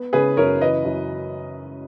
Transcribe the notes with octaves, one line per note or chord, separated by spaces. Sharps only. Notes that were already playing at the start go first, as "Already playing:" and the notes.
Already playing: B3
C#3 G#4 B4
F#2 A#4 C#5
E3 B4 D#5
F#2